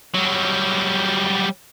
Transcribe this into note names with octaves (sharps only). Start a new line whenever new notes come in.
F#3 G3